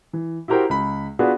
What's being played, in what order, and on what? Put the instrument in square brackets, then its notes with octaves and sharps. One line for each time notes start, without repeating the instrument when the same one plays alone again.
[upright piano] E3
E4 F#4 G4 A#4 C5 G5
C#2 B5
B3 D4 F4 F#4 G#4 B4